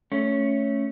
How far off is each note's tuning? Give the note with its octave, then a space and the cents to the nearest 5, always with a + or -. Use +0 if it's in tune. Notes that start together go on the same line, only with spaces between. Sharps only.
A3 +0 C#4 +0